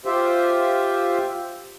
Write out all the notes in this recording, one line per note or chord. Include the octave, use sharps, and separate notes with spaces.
F4 G4 C5 E5